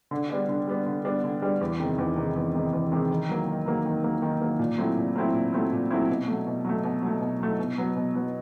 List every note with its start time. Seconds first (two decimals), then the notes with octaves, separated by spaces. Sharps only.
0.11 D3
0.30 G3 B3 D4
0.49 D3
0.67 G3 B3 D4
0.86 D3
1.04 G3 B3 D4
1.24 D3
1.42 G3 B3 D4
1.61 E2
1.80 C3 D#3 G#3
1.98 E2
2.16 C3 D#3 G#3
2.36 E2
2.55 C3 D#3 G#3
2.73 E2
2.92 C3 D#3 G#3
3.10 D#3
3.29 F#3 A#3
3.48 D#3
3.66 F#3 A#3
3.85 D#3
4.04 F#3 A#3
4.22 D#3
4.41 F#3 A#3
4.59 A#2
4.78 F#3 A3 C4 E4
4.97 A#2
5.16 F#3 A3 C4 E4
5.34 A#2
5.53 F#3 A3 C4 E4
5.72 A#2
5.91 F#3 A3 C4 E4
6.09 B2
6.27 F#3 A3
6.47 B2
6.65 F#3 A3
6.84 B2
7.03 F#3 A3
7.21 B2
7.40 F#3 A3
7.59 B2
7.78 F#3 B3
7.96 B2
8.15 F#3 B3